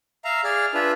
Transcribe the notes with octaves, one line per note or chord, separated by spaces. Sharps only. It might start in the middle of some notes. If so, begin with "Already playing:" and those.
E5 F5 A#5
G#4 D5 F6
D4 F4 B4 E5